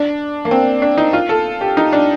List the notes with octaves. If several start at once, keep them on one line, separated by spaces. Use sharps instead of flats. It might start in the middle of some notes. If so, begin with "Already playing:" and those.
Already playing: D4
A#3
C4
D4
D#4
F4
A4
G4
D#4
D4